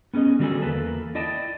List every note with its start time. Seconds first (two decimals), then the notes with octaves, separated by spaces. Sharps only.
0.14 B3 C#4 G#4 D#5
0.39 D3 G3 F#4 G#4 A4 G#5
0.62 E2 A#3 A4 B4 A5
1.15 E4 D5 D#5 G5 A5